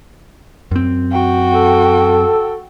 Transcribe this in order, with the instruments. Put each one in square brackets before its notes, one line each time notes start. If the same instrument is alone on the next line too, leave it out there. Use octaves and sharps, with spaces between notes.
[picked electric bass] F#2 C4
[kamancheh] F#4 G5
[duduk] A4